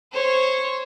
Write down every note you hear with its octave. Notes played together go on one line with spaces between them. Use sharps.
C5 C#5